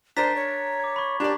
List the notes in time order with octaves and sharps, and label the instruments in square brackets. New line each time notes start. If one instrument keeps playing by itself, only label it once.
[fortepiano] D4 A#4 [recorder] C5 [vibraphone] A#5 [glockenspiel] A6 B6
[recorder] C#5
[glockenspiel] D6 G#6
B5 C#6
[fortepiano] D4 A#4 D5 [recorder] G4